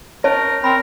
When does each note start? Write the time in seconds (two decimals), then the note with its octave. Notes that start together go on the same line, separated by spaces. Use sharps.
0.24 C#4 A#4 C#5 D#5 A5
0.64 C4 A#4 B5